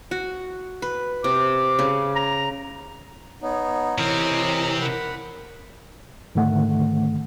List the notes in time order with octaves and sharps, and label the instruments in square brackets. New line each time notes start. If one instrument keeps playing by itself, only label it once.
[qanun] F#4
B4
[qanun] C3 [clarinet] D6
[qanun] C#3
[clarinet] A#5
[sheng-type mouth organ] B3 D#4 [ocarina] C#5
[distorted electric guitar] C3 C4 [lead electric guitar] E3 [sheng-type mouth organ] A#4 D#5
[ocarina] A#4 [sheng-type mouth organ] F#5 B5
[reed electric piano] G#2 D3 D#3 A3 F#5